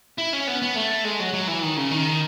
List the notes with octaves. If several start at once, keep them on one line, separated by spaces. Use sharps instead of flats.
E4
C#4
B3
B3
A3
G#3
F#3
F#3
E3
D#3
C#3
D#3